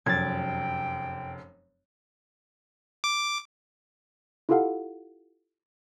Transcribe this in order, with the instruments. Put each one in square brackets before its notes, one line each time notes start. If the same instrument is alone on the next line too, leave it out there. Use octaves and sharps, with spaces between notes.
[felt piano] F1 F#2 [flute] G5 [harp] G#6 A6
[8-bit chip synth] D6
[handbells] E4 F4 G4 A4 F5 F#5